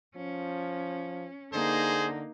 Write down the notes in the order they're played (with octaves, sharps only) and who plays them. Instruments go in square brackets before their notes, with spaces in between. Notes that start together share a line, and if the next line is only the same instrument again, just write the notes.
[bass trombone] F3 [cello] C#4
[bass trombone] D3 [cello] A#3 D#4 [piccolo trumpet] G#4 [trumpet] C5